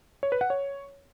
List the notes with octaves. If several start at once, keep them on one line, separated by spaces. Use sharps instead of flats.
C#5
B4
F#5
C#5